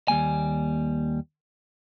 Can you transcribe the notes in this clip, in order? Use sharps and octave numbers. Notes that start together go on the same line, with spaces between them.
D#2 G3 A#3 G#5